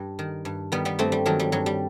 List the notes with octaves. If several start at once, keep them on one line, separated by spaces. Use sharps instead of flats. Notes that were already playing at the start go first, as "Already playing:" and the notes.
Already playing: G2 G3
D#3
G2
D#3 G3 B3
G3 B3
G2 A3 C4
G3
D#3 F#3 A3
G3
G2 F#3
G3